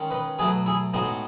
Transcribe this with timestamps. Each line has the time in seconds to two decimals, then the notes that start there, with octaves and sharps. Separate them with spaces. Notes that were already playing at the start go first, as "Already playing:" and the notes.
Already playing: D#3 G#3 C#4
0.11 B4 D#5
0.39 B2 F#3 A3 G#4 B4
0.66 E4 G#4
0.94 A2 G#3 B3 D#4 F#4